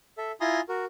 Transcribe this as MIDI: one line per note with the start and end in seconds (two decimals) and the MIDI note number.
0.18 0.32 69
0.18 0.32 76
0.41 0.61 64
0.41 0.61 65
0.41 0.61 80
0.41 0.61 82
0.41 0.61 84
0.41 0.61 87
0.69 0.85 66
0.69 0.85 70